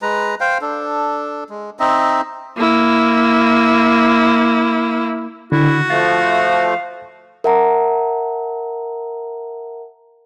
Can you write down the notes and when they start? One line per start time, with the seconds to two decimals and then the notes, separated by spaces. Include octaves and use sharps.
0.02 G#3 B4 A#5
0.41 C5 F5 G5
0.61 D4 A4
1.49 G#3
1.80 C4 D#4 D#5 E5
2.57 A#3 E4
5.52 D3 E4 F#4
5.90 F3 A3 F5 A6
7.44 A#4 E5 F#5 A5 A#5